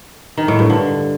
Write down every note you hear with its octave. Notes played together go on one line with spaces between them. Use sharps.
D#3
A2
G2
D3